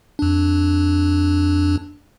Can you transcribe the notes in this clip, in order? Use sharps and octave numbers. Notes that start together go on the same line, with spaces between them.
F2 D4